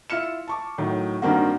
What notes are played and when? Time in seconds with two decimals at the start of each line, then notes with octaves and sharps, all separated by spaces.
0.10 E4 F4 F6 C#7 E7
0.48 A5 C#6 D6
0.78 A2 D#3 F#3
1.22 G2 D#3 A#3 C4 F#4